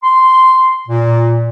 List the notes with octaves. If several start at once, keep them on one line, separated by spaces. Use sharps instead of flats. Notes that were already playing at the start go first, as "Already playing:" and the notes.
C6
A#2